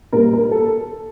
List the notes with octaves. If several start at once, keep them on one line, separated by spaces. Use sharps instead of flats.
A#2 G3 A#3 A#4
A#4
A4